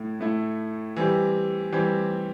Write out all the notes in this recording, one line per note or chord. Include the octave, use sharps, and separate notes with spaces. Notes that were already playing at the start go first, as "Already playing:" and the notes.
Already playing: A2 A3 E4
A2 A3 E4
E3 G3 C4 G4
E3 G3 C4 G4